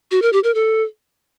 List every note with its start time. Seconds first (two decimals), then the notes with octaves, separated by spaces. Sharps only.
0.11 F#4
0.22 A#4
0.33 G4
0.44 A#4
0.55 A4